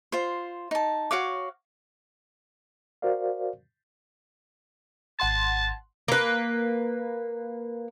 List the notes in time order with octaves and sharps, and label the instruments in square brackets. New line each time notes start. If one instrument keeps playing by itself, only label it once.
[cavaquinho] F4 C5
D#4 A5
F#4 C#5 F5 D6
[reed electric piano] F#4 A#4 C5 D5 F5
[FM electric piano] G#1 F#5 C6 [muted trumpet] A5
[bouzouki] A#3 B4